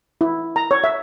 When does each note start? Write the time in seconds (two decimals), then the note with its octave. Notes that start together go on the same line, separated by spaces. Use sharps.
0.21 E4
0.56 A#5
0.71 C#5
0.84 E5